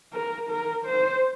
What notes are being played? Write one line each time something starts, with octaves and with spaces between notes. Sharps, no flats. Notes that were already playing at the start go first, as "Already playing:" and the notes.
A#4
A#4
C5